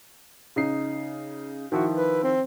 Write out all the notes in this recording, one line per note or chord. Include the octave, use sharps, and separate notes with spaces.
C#3 D#4 C7
D#3 F3 E4 F#4
B4
C4